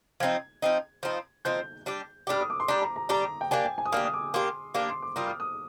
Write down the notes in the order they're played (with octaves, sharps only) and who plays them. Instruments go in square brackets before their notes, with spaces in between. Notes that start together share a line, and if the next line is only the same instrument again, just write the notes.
[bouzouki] F3 C4 D#4 [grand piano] G#6
[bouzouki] F3 C4 D#4
F3 C4 D#4
[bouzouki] F3 C4 D#4 [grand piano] G6
[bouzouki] G3 D4 G4
[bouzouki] G3 D4 G4 [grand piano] F6
[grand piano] D#6
D6
C6
[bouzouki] G3 D4 G4 [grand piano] A#5
[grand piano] A#5
A#5
[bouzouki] G3 D4 G4 [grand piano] A#5
[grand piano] G5
[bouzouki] A#3 D4 G4 [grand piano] G#5
[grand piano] G5
G#5
D#6
[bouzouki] A#3 D4 G4 [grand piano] F6
[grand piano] D#6
D6
[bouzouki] A#3 D4 G4 [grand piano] C6
[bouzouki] A#3 D4 G4 [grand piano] D6
[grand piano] C6
D6
[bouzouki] G3 A#3 F4 [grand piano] D#6
[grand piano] F6
D#6